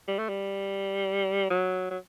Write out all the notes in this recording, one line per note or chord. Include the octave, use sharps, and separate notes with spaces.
G3
A3
G3
F#3
F#3